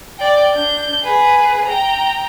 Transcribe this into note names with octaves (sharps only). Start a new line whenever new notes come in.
D5 G5
D4 G6
G#4 B4
G5 A#5